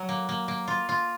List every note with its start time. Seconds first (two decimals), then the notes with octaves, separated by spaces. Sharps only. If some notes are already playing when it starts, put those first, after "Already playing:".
Already playing: F#3
0.09 A#3
0.29 A#3
0.48 A#3
0.68 F4
0.89 F4